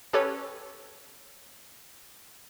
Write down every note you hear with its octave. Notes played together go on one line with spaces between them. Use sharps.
C#4 G4 A4 B4 C#5